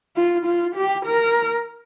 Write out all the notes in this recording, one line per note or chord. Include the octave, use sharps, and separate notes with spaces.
F4
F4
G4
A#4